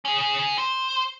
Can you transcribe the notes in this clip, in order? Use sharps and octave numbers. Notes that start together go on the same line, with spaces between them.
C#4 G#4
C5